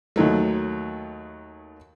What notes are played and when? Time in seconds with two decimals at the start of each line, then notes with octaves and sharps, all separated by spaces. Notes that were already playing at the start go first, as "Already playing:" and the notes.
0.16 D#2 D#3 F#3 A3